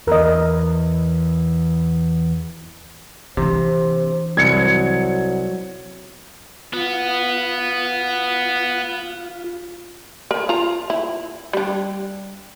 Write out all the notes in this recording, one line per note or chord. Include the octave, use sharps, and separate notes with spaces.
E2 A#4 D#5
C3 E3 D4 C5
C2 F#3 G#6 C#7
B3 F4
A#4
F4 A#5
E4
G3 D4